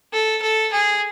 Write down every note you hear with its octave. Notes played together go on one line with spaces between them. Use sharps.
A4
A4
G#4